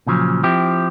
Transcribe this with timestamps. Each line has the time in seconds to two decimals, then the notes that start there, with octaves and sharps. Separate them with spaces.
0.07 A#2 C#3 F3 F#3
0.43 F3 C4 E4 G4